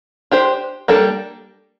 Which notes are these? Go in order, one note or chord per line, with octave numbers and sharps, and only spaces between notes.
D4 G4 C5
G3 A#3 D4 A4